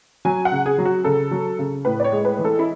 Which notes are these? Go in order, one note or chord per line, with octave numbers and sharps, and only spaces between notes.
F#3 G#5
F#5
C#3
G#4
F#3
F#4
C#3 A4
F#3
C#3
A2 B4
D5
C#5
G#3
B4
E3
A4
E4